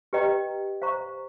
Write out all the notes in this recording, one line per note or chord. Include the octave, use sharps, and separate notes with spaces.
G4 B4 D#5 G5 A#5
C5 F5 A#5 C#6